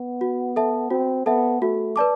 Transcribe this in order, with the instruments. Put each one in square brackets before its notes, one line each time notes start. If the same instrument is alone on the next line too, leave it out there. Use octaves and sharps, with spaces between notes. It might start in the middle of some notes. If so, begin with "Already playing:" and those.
Already playing: [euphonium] B3
[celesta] F#4
A4 E5 A5
[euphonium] C4 [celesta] F#4
[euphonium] B3 [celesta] A4 E5 A5
[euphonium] A3 [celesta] F#4
[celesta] B4 D5 A5 D6